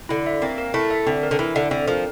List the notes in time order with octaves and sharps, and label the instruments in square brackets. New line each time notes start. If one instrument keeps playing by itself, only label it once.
[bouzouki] D3 [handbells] E4
[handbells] E5
[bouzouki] A#3 [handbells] C4
[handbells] A#4
[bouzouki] A3 [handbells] E4
[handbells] E5
[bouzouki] D3 [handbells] C4
[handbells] A#4
[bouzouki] D3
[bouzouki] E3 [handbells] E4
[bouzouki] D3 [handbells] E5
[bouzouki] D3 [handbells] C4
[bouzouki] F3 [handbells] A#4